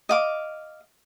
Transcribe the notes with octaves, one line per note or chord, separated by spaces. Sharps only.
D#5 F5 D6